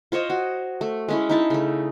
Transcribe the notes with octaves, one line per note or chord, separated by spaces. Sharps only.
F4 C5 C#5 D#5
F#4
A3
G#3 C#4 E4
D#4 E4 A5
C#3 A3